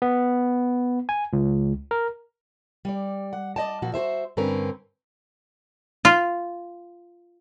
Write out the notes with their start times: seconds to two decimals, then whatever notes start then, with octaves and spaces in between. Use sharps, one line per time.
0.02 B3
1.09 G#5
1.33 C#2
1.91 A#4
2.85 G3 D5
3.33 F#5
3.56 D5 D#5 G5 A5
3.82 A#2 F3 F#4
3.94 F#4 G#4 C5 E5
4.37 G2 D3 C4 C#4 A#4 B4
6.05 F4